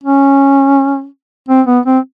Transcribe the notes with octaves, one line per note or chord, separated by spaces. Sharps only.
C#4
C4
B3
C4